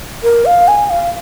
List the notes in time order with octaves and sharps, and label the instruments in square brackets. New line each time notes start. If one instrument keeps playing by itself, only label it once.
[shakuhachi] A#4
F5
G#5
F5